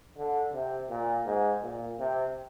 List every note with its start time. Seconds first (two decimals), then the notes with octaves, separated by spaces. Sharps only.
0.17 D3
0.53 C3
0.90 A#2
1.26 G#2
1.62 A#2
1.99 C3